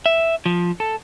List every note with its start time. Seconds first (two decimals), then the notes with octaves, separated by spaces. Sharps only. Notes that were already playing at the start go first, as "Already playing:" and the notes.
0.06 E5
0.46 F3
0.80 A4